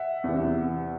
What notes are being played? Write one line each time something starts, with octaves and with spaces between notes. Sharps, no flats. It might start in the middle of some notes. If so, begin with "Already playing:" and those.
Already playing: E5 F#5
E2 C3 E3